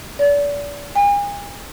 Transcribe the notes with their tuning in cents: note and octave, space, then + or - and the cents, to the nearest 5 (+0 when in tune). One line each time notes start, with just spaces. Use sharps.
D5 -35
G#5 -40